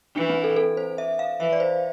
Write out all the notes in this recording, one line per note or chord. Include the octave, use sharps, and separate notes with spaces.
E3 D4
C4
A4
A4
C5
E5
F5
E3 E5
D5
C5